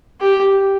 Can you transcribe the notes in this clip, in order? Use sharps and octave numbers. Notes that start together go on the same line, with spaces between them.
G4